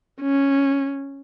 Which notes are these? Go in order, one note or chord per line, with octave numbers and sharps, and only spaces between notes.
C#4